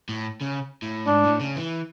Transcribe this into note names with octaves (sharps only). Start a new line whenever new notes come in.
A2
C#3
A2
G#2 D4
A2
C#3
E3